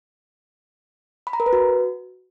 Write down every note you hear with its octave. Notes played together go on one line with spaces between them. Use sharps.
B5
A#5
A#4
B4
F#4